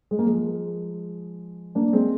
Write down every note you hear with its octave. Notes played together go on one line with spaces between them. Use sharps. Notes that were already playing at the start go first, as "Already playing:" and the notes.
G#3
A#3
F3 G#3
A#3 D4
G#3 C4